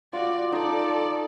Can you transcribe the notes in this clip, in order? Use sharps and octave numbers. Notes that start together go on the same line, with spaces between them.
F4 F#4 D5
D#4 A4 D5